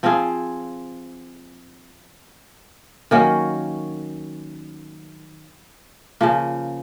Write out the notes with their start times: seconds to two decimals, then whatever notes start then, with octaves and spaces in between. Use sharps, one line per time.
0.03 F3 C4 F4 G#4
3.11 D#3 F#3 A#3 C#4
6.21 C#3 F3 A#3